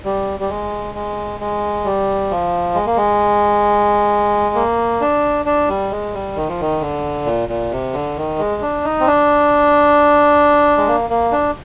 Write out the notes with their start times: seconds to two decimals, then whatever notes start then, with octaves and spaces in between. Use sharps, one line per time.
0.05 G3
0.40 G3
0.49 G#3
0.95 G#3
1.40 G#3
1.85 G3
2.31 F3
2.75 G#3
2.86 A#3
2.97 G#3
4.55 A#3
5.01 D4
5.45 D4
5.68 G3
5.91 G#3
6.14 G3
6.36 D#3
6.48 F3
6.61 D#3
6.81 D3
7.26 A#2
7.49 A#2
7.72 C3
7.93 D3
8.17 D#3
8.39 G#3
8.62 D4
8.84 D#4
9.00 C4
9.07 D4
10.77 G#3
10.88 A#3
11.10 A#3
11.32 D4